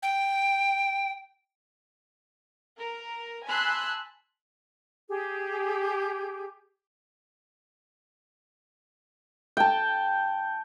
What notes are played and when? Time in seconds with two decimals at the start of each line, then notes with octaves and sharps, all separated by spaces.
0.03 G5
2.80 A#4
3.48 G#5 A5 B5 C6 E6 F#6
5.09 G4 G#4
9.57 G5 A5